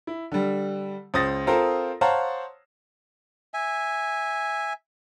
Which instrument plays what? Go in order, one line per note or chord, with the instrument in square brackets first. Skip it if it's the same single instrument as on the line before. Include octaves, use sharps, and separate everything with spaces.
[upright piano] E4
D3 G3
C#2 C5 D#6 A6 A#6
C4 F4 A4 A#4 C5
C5 C#5 F5 F#5 A5 A#5
[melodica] E5 G#5